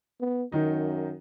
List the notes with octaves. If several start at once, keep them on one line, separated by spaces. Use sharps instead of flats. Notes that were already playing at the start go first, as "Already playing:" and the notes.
B3
F#2 D#3 D#4